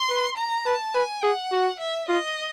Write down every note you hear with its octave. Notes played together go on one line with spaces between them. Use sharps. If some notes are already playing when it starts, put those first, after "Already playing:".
Already playing: C6
B4
A#5
B4 A5
B4 G#5
G#4 F#5
F#4
E5
F4 D#5